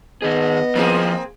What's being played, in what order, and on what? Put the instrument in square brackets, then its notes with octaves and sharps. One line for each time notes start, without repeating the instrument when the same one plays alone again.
[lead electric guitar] D#3 G#4 [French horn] B3 [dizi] D#5
[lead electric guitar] F3 E4 [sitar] A#3 C4 G#4